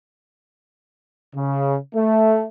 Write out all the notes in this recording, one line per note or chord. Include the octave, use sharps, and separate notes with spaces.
C#3
A3